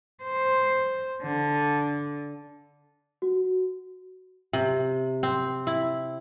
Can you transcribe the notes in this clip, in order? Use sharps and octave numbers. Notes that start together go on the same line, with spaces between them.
C5
D3
F#4
C3
C4
E4